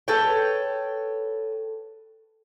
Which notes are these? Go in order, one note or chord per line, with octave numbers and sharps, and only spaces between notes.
A4 B4 C#5 G5